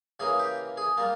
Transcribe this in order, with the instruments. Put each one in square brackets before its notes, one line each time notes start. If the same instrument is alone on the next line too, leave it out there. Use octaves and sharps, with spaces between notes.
[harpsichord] C#3 E3 A#3 G#4
G4
G#4
G3 A#3 F4